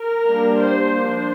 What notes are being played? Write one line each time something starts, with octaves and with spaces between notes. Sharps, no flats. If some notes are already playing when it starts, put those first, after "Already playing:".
Already playing: A#4
G3 A#3 D4
C5
F3 A#3 D4